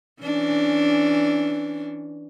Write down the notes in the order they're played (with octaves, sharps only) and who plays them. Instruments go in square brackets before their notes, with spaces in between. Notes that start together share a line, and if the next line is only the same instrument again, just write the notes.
[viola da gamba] E3 C#4 D4